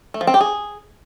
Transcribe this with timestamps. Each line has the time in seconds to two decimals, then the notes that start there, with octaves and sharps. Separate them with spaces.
0.14 A3
0.21 F3
0.27 C4
0.34 G4
0.41 G#4